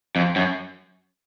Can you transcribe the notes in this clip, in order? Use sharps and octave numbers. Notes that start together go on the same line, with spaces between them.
F2
F#2